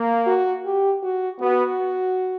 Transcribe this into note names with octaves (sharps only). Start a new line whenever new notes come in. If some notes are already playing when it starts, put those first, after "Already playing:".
Already playing: A#3
F#4
G4
F#4
B3 F#4